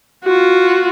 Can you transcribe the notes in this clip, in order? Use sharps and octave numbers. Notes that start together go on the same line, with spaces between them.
F4 F#4